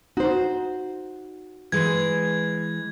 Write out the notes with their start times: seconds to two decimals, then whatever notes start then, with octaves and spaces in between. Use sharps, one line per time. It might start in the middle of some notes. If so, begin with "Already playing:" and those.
0.17 D#4 F#4 C5
1.72 E3 G#3 G#6